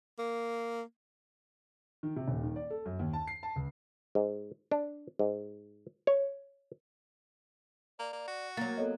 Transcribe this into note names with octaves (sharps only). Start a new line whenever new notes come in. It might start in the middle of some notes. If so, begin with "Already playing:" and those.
A#3
D#3
C3
D#1
D#3
D5
A4
F#2
D#2
A5
C7
A5
C#2
G#2
D4
G#2
C#5
A#3 D5
A#3
F#4
F#3 A#3 A6
B3 A4 C#5 D#5